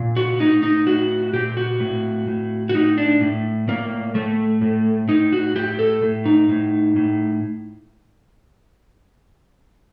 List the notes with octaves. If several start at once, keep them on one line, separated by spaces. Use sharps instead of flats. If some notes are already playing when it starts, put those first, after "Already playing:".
Already playing: A#2
F#4
A2 D#4
D#4
A2 F#4
A#2 G4
F#4
A2
A2
F#4
A2 D#4
D4
A2
A2 A#3
A2 A3
A2
A2 D#4
F#4
A2 G4
A4
A2
D#4
A2
A2